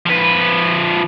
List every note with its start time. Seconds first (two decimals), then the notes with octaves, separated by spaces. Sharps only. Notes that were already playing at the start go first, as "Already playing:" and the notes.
0.06 F3 B4